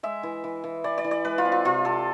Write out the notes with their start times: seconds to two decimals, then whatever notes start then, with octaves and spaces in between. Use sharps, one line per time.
0.03 G#3 E5
0.23 E3
0.44 E3
0.64 E3
0.84 E3 D5
0.98 D5
1.04 E3
1.11 D5
1.25 G#3 B4
1.38 F4
1.45 C4
1.52 F4
1.65 C3 F4
1.85 C3 A4